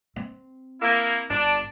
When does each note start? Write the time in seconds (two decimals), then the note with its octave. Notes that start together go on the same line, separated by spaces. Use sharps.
0.16 C4
0.81 A#3 E4
1.30 G1 D4